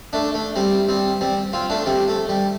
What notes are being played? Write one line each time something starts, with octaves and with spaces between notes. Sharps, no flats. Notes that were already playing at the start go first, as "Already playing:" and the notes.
A3 D4
A3
G3 C4
G3 C4
G3 C4
C4 F4
A3 D4
G3 C4
A3
G3